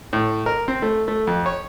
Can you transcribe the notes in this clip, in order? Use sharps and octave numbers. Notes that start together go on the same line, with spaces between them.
A2
A#4
C4
A3
A3
F2
C#5